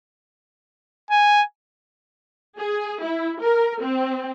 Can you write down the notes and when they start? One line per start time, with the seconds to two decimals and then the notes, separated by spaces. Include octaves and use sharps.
1.11 G#5
2.56 G#4
3.01 E4
3.40 A#4
3.81 C4